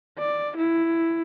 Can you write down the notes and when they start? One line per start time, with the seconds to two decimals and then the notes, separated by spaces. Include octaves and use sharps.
0.18 D5
0.56 E4